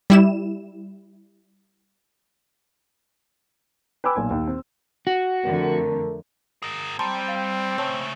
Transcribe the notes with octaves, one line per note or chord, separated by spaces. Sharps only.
G3 E4 E7
B4 G5 G#5 B5 D6 E6
B1 A#2 G#5
D#2
C4
F#4
F2 D3 A3 A#4
G#4 A#4
G3 C4 A5 A#5 C6
F5
C#3 A3 C5 C#5 A5